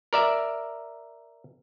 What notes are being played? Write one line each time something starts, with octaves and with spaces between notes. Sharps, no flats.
A#4 D5 E5